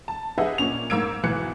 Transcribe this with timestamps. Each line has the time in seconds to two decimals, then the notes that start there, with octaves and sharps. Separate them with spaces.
0.08 A5
0.38 G4 G#4 B4 D#5 E5 F#5
0.58 A#2 C#4 F7
0.90 G#2 A#3 E6 G#6 D7
1.23 B1 G#2 E3 F#6 C#7